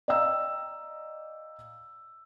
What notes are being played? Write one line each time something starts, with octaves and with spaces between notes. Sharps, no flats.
D5 D#5 F5 G5 A#5 E6